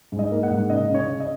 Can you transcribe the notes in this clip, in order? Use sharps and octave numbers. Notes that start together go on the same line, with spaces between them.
G#2
D#5
A#3
F#5
G#2
C#3 D#5
C#3
C#5
C#3
D#5